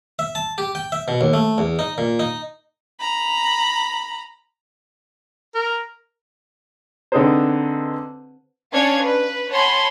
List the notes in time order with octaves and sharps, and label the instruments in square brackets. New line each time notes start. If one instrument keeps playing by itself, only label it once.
[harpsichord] E5
A5
G4
G5
E5
B2
D#2
A3
E2
D#4
A#2
D#4
[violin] A#5 B5
[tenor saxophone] A#4
[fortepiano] D3 C4 D#4 G#4 B4 C5
[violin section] C#4 D4 C#5 F5 G#6
B4
C#5 F#5 G#5 A5 B5 C6